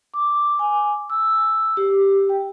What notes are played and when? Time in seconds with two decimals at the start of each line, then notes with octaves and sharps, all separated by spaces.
0.14 D6
0.59 G#5
1.10 E6
1.77 G4
2.29 G5